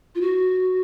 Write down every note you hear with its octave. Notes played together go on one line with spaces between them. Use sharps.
F4
F#4